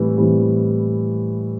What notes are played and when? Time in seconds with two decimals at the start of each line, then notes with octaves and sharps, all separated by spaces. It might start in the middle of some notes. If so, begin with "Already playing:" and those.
Already playing: A2 E3 G3 C4
0.18 A2 E3 G3 C4